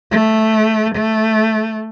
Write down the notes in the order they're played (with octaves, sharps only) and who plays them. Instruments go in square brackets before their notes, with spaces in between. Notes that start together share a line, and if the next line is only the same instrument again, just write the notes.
[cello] A3
A3